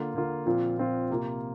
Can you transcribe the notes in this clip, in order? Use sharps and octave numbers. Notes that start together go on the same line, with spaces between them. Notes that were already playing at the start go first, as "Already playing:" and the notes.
Already playing: D3 A#3 F4
D3 A#3 F4
A#2 F3 C4 F4
A#2 F3 C4 F4
C3 A#3 F4